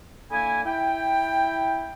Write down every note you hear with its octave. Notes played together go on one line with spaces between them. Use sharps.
D3 A#3 E4 G#5
E4 G5